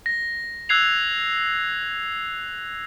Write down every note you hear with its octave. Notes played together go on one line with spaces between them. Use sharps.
A#6
E6 F#6 G#6 C7 F7